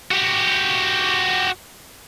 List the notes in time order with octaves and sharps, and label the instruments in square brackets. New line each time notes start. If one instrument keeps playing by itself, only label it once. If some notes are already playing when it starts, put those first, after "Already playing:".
[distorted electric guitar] F#4 G4